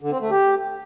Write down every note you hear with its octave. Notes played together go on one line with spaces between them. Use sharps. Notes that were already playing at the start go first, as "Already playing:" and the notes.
D3
C4
A3
G4